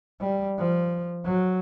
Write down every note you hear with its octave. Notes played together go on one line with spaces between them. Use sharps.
G3
F3
F#3